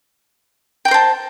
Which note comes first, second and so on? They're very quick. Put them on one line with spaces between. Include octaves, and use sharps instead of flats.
G5 A#5 C5 A5